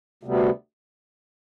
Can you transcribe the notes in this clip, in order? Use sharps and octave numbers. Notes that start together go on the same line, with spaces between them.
D2 C3 G3 B3